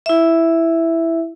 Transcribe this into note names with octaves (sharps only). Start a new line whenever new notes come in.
E4 E5